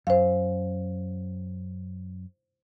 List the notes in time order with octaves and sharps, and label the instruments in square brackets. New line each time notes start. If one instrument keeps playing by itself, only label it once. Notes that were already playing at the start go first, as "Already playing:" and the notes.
[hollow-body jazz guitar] F#2 [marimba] C5 F5